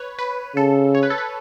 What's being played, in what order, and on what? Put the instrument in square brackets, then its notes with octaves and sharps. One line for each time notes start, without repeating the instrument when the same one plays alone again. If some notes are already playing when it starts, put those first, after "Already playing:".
Already playing: [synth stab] B4 C#5
B4
[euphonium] C#3 [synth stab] A4
[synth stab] C#5
B4
A4
B4